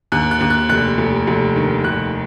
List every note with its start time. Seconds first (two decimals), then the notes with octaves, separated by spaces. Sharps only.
0.12 D#2 F#6
0.31 F#6
0.41 D#2
0.50 F#6
0.69 F1 F#6
0.98 F1
1.28 F1
1.56 D#3
1.84 F1 F#6